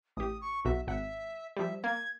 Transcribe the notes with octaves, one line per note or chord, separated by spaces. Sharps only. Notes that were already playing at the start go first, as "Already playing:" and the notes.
A1 G4 D#6
C#6
B1 F#4 E5
G#1 E5 F#5
F3 G3 E5
A#3 G#6